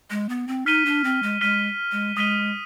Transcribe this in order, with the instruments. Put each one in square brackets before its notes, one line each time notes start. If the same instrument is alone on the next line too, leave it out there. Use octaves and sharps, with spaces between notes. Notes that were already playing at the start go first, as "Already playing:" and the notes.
[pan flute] G#3
B3
C4
[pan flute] D#4 [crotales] F6 B6 D#7 G7
[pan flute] D4
C4
G#3
[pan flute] G#3 [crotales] F6 B6 D#7 G7
[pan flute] G#3
[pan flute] G#3 [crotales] D#6 B6 D#7 G7